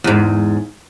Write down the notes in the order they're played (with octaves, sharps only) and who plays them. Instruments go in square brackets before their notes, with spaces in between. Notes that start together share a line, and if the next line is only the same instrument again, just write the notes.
[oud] E2 G#2